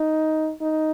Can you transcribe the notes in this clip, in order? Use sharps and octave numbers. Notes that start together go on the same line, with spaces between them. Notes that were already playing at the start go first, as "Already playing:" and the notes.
Already playing: D#4
D#4